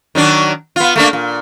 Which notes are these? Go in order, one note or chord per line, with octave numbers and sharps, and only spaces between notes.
D#3 F#3 D4
B3 F4
A3 A#3 D4
A#2